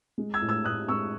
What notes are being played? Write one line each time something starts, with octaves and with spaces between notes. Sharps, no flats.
G#3
E6 G#6
A2
E6 G#6
A2 D#6 F#6
G#3 C#6 E6